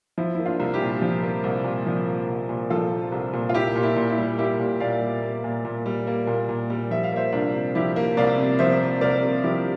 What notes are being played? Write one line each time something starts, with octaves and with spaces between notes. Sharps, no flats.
F3 E4
A#3 E4
D4 F4
C2
E4 G4
A#2
F3
A#3
C2
A#2
F3
A#3
C2
A#2
F3 F4 A4
A#3
C2
A#2
F4
A#3 E4 G4
A#2
E4
A#2
E4
G3
A#3 E4 G4
A#2
A#2 D5 F5
G3
A#3
A#2
A#2
G3
A#3
A#2
A#2
G3
F3 E5
F5
A#3 C5 E5
C2 D4 F4
C3
F3 E4 G4
A#3
C2 D5 F5
C3
F3 C5 E5
A#3
C2 A#4 D5
C3
F3 E4 G4